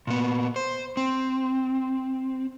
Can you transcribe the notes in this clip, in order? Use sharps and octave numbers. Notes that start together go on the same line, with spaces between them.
A#2 B3
C5
C4